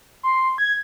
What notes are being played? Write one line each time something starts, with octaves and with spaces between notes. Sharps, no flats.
C6
G#6